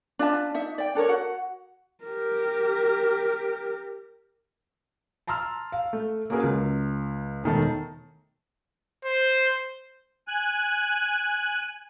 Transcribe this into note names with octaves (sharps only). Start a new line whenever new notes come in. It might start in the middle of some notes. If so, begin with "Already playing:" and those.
D4 F4 E5 A5
D#4 E5
D5 G5
D4 A4 A#4 C#5
F#4 F#5
G4 A#4
A5 A#5 C6 E6 F6
F5
A3
A#3 C#4 F#4 G#4 A#4 B4
C#2
E1 D#3 A3 A5
C5
G#5 F#6